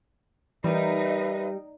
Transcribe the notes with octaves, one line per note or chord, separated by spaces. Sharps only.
E3 G3 D#4 A#4 B4 E5